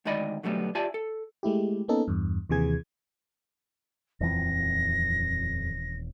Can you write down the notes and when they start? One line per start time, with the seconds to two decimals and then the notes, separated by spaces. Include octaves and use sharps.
0.05 D2 D#3 G#3 D5 D#5 B5
0.43 B2 D3 F#3 G3 A3 B3
0.75 F4 G4 D5 E5 G#5 A5
0.94 A4
1.43 G#3 A3 E4 G4
1.88 A#3 B3 C#4 D#4 A4
2.08 E2 G2
2.49 D#2 C3 E3 G#4 G#6
4.21 D#1 F2 E3 C4 A#6